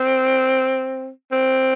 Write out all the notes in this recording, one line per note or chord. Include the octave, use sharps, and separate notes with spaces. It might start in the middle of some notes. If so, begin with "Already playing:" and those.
Already playing: C4
C4